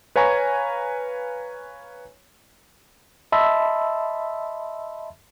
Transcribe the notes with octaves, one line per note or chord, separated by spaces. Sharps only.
B4 C#5 F5 G#5 A#5 C#6
D#5 E5 A5 B5 C6 E6